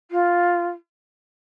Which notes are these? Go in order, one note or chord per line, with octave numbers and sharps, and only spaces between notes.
F4